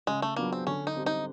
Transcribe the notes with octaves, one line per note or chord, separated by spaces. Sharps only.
C#3 G#3
A3
F#3 A#3 B3 D4 F4
C4
D3 C#4
D#4
G3 C4
D#4